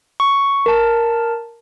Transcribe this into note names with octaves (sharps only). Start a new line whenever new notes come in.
C#6
A#4 A5